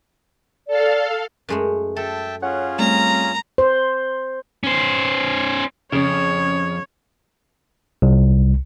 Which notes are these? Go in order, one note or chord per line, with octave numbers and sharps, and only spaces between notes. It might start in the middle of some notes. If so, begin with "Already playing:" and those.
A4 D5 F5
F#2 G#3 A3
A4 E5 G5 A5
C#4 F4 G#4 C#5 F#5 F#6
G3 A3 C4 A#5
C5
C#4 C5
F2 C#3 C#5
C2